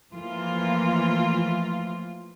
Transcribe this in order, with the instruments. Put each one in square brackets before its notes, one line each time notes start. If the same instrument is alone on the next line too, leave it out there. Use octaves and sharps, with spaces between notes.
[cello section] E3 F3 A3 A#3 F4